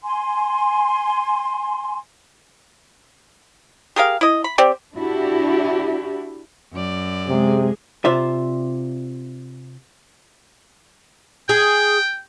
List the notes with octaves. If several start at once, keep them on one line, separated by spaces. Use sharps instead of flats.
G#5 C6
G4 G#4 A#4 F5
E4 D#5
B5
C4 G4 D5
D4 E4 F#4 G4
F#2 D5
C3 G#3 G#4
C3 F4 C5 D5 E5
G#4 G5